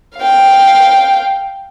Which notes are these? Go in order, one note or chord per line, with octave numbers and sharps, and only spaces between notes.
F5 G5